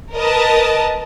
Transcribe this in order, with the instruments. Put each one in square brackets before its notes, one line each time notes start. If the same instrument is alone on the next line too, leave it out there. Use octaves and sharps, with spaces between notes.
[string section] A#4 B4 D#5 A5